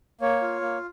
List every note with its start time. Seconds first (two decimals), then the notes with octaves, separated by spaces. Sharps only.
0.21 A#3 C#5
0.42 F4
0.61 A#3